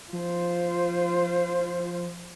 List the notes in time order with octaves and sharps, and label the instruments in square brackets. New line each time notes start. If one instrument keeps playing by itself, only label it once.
[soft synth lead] F3 [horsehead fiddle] F4 C5